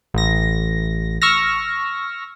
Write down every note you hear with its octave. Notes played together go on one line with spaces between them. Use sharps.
A1 A#6
C#6 E6 F6 A#6